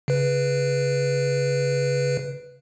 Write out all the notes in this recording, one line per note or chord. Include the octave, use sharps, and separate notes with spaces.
C#3 B4